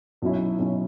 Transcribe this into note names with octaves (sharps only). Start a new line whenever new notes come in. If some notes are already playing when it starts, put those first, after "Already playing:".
B1 B2 F#3 C#4 E4
B1 B2 F#3 C#4 E4